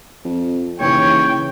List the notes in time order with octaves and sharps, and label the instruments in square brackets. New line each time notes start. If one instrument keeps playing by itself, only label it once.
[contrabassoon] F2
[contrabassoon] D#2 [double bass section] C#3 E3 [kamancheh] C#5 [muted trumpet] G5